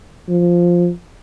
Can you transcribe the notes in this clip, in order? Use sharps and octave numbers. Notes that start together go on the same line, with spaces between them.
F3